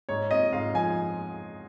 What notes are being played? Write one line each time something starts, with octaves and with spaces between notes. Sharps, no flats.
G#2 C#5
C4 D#5
G#2 F5
F3 G#5